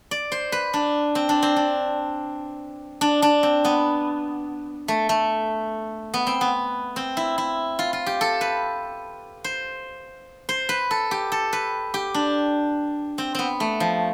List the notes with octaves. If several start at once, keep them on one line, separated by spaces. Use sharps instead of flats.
D5
C5
B4
D4
C4
D4
C4
D4
D4
D4
C4
B3
A3
A3
B3
C4
B3
C4
E4
E4
F4
F4
G4
A4
B4
C5
C5
B4
A4
G4
A4
B4
G4
D4
C4
B3 C4
A3
F3